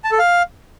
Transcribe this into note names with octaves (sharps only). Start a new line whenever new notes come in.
A5
A4
F5